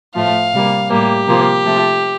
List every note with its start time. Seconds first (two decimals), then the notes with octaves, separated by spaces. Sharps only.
0.15 A2 F3 A3 F5
0.53 C3 G3 A#3
0.90 A2 G3 A#3 G4
1.27 C3 F3 A#3
1.65 C3 F3 A3